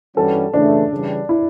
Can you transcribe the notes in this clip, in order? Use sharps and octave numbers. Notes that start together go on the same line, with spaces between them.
G2 E3 G3 C#4 F#4 A4
C#3 E3 A3 D4
C#3 E3 G3
E4